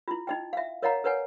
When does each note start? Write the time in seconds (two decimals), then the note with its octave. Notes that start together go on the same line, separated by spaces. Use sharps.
0.08 E4 F4
0.27 D#4 D#5 G5
0.53 E5 F5
0.82 A#4 C#5 D#5 F5 F#5 A#5
1.04 A#4 B4 C#5 F#5 G#5